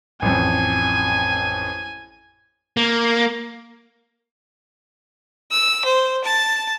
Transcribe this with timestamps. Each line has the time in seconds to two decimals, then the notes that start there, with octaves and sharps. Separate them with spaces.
0.22 A1 F2 G#5
2.77 A#3
5.52 E6
5.85 C5
6.24 A5